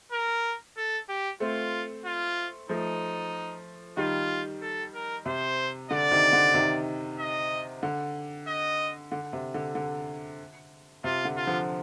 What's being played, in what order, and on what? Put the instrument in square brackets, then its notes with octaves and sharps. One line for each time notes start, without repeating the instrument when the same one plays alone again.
[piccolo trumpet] A#4
A4
G4
[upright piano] A3 C4 [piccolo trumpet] F4
[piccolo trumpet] F4
[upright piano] F3 A3 [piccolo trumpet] D#4
[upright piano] D#3 G3 [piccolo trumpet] F4
[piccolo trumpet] A4
A#4
[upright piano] C3 [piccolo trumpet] C5
[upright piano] D3 [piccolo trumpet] D5
[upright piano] C3 D#3
D3
C3 D#3
[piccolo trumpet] D#5
[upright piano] D3
[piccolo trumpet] D#5
[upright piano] D3
C3
D3
D3
[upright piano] C3 [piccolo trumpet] F4
[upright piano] D3
[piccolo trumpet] F4
[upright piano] D3 F3